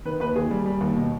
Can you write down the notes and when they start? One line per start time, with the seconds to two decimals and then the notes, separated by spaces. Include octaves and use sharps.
0.05 D#3 B4
0.20 D#2 B4
0.36 D#2 G#4
0.51 G3
0.66 G3
0.81 D#2
0.96 B2